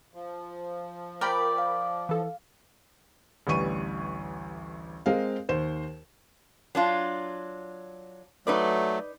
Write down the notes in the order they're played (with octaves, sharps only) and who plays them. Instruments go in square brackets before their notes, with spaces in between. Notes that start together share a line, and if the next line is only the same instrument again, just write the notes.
[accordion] F3
[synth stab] A#4 G5 B5 [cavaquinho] D5
[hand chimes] F5
[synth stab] E3 A4
[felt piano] A1 D2 G3 B4 C#6 D#7
G#3 C4 A#4 F5
D#2 C5 E7
[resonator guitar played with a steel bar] F#3 D4 F4
[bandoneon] F#3 A3 [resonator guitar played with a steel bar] D#4 B4 D5